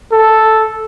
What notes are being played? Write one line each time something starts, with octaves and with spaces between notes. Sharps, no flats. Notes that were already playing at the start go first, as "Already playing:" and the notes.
A4